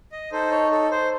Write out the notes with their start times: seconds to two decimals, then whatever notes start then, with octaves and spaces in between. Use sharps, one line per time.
0.12 D#5
0.32 D#4 A4 C5
0.51 C#5
0.71 A4
0.91 C5